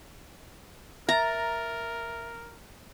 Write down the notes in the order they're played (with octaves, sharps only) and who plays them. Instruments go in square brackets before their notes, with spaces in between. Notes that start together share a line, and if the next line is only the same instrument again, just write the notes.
[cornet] A#4 [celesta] E5 A6 [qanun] A#5